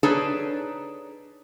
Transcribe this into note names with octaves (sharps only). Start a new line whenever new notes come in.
D4 D#4 G#4 A4 B4 C#5